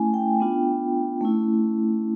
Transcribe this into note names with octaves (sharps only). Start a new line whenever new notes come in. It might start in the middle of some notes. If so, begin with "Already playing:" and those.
Already playing: A3 C#4 E4 G#5
G5
B3 D4 F4
A3 C#4 E4